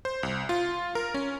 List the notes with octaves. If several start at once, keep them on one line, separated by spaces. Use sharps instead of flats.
C5
C2
F4
A#4
C#4